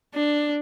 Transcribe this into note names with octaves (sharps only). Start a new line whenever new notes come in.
D4